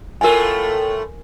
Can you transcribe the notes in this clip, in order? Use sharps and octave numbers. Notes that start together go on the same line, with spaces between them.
A2 A3 F4 A#4 G#5